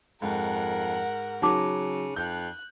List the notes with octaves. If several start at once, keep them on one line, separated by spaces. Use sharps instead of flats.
F2 G#2 A#4 F#5
C#3 F#3 D#4 A5 D6
F2 F#6 G6